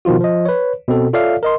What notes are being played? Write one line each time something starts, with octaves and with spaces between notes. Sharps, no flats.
B2 D#3 F3 F4 F#4
F3 D#5
B4 C#5
B2 C4 A4
F4 A4 C#5 D5 E5 F5
A#4 D#5 C6